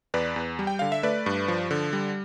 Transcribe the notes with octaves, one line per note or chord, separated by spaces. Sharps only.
E2 B4 D5
E2
G3
G5
D3 F5
E5
A3 B4 D5
G2
F3
D3
G3